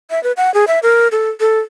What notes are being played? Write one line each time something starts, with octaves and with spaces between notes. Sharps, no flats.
E5
B4
F#5
G#4
E5
A#4
A4
A4